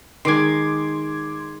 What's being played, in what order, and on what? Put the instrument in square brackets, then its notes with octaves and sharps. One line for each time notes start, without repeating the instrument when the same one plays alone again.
[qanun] D#3 G#3 [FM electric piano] C6 D6 G#6